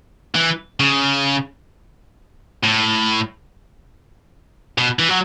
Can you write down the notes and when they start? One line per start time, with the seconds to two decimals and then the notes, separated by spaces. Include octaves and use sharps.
0.35 E3
0.80 C#3
2.64 A2
4.78 B2
4.99 E3
5.09 F#3